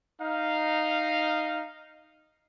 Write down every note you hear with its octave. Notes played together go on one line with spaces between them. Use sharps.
D#4 F5